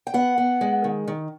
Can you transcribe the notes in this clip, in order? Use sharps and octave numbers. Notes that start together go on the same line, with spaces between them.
G5
B3 F#5
B3
G#3
D#3
D#3